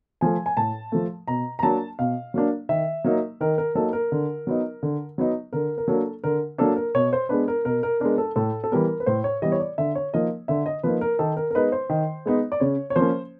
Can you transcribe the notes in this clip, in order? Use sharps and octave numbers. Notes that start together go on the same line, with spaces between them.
F3 A3 G#5
G#5
A2 A5
F3 A3
B2 A#5
A#5
F#3 A#3 D4 A5
B2 F5
F#3 A#3 D4
D#3 E5
F#3 A#3 D#4
D#3 A#4
A#4
F#3 A#3 D#4 A4
A#4
D3
F#3 B3 D#4
D3
F#3 B3 D#4
D3 A#4
A#4
F#3 A#3 D4 A4
D3 A#4
F#3 A#3 D4 A4
A#4
B2 C#5
C5
G#3 B3 D4 B4
A#4
B2 A#4
A#4
G#3 B3 D4 A#4
A4
A2 A4
A4
E3 G3 B3 A#4
B4
A2 C5
C#5
E3 G3 B3 D#5
C#5
D5
D3 E5
C#5
F3 A#3 D#4 D#5
D3 E5
D#5
F3 A#3 D#4 B4
A#4
D#3 A4
A#4
A#4
G#3 B3 D#4 B4
C5
D#3
G#3 B3 D#4
D5
C#3 C#5
C#5
F3 A#3 C#4 C5